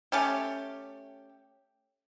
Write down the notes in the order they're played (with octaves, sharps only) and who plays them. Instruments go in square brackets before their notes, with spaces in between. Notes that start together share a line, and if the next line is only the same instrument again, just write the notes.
[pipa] A3 C#4 G4